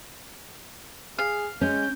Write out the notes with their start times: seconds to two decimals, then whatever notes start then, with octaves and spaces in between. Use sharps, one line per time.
1.18 G#4 F5
1.61 G#3 C#4 G6